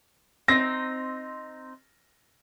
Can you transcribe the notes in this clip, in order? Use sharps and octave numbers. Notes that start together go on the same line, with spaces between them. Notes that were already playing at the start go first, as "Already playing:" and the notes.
C4 D#4 A#6